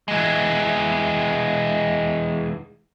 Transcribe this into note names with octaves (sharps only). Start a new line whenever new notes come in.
E3 G#3